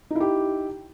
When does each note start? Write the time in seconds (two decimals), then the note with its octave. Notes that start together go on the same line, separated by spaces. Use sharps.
0.10 D#4
0.15 E4
0.20 G4